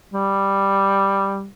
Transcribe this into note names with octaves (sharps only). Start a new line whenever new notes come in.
G3